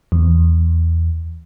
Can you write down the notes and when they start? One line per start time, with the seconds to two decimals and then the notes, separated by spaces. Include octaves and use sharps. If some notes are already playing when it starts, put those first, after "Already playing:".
0.12 E2